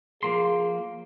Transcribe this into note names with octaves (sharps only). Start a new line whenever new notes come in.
F3 A#3 G#4 C6